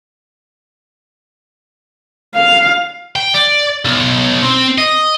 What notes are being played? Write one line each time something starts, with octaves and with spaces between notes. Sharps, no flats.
F5
G5
D5
B1
C4
D#5